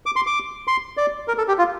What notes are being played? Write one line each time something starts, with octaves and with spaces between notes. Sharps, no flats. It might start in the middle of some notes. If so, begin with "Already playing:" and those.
D6
C6
D6
C6
D5
A#4
A4
G4
F4